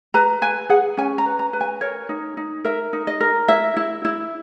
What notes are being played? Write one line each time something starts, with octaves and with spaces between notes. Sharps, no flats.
B4 A#5
B4 G#5
G#4 F#5
C#4 G#5
A#5
B4
A#5
B4
G#5
A#4 C#5
D#4
D#4
A#4 E5
D#4
D#5
A#4
E4 E5
E4
E4